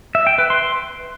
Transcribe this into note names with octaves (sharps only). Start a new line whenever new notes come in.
E5
G5
B4
C6